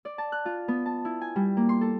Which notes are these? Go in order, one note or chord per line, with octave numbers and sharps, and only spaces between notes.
D5
A5
F#6
F4
B3
A5
E4
G#5
G3
A#3
C6
A4